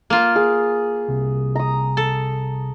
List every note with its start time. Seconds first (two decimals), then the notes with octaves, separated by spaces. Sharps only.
0.10 A#3 F4
0.36 G#4
1.08 C2
1.56 A#5 D#6
1.97 A4